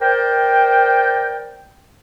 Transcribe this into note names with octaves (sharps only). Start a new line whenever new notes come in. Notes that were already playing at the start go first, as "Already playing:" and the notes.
A#4 C5 D5 G5